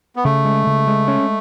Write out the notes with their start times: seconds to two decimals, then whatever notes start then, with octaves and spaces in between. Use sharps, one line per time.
0.16 B3
0.24 C#3 A3
0.45 G#3
0.67 C#3
0.87 G#3
1.08 C#4